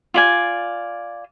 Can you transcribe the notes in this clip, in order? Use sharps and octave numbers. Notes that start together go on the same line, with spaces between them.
F4 D5 G#5